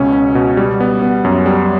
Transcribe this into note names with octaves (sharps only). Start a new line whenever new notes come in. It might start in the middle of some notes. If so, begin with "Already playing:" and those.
Already playing: C#2 B2 C#4
C#4
B2
G3
B3
B3
F#2
G3